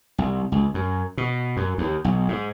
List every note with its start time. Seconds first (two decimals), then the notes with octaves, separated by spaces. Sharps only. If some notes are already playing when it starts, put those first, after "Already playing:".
0.18 C2
0.52 C#2
0.74 F#2
1.17 B2
1.57 F#2
1.78 D#2
2.04 B1
2.28 G#2